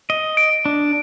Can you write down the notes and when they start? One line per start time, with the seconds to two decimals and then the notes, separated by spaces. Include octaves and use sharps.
0.10 D#5
0.37 D7
0.66 D4